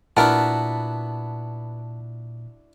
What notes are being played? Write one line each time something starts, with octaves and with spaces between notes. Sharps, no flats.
A#2 B3 D4 E4 F#4 A#4 A5